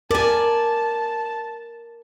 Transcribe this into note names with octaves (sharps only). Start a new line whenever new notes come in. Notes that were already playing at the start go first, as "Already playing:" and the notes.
A#4 D5 G#5 A5